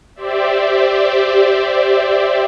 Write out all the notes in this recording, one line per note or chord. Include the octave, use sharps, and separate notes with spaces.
G4 C5 D5 E5